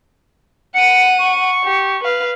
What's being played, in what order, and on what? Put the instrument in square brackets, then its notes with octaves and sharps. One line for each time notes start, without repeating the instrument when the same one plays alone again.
[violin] F#5 D#7 [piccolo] C#7
[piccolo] C#6
[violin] G4
B4 F5